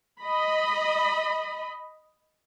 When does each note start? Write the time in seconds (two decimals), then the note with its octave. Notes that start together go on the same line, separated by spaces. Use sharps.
0.20 D#5 B5